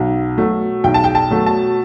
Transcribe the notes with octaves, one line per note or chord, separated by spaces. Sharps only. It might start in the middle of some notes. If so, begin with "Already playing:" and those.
Already playing: B1 F#5
B2 F#3 A3
B1 G5
A5
G5
A5
B2 F#3 A3
A5